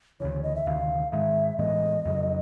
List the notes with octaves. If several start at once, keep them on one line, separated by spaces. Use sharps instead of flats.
D2 C#3 E3 C#5
D#5
E5
D2 C3 D#3 F5
G#2 D#3 G#3 E5
A2 E3 G#3 B3 D#5
F2 C#3 F#3